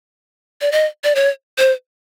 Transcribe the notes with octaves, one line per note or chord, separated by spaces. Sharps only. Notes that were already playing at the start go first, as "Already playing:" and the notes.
D5
D#5
D5
C#5
C5